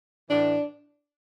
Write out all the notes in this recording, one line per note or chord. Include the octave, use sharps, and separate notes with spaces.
A2 E3 D4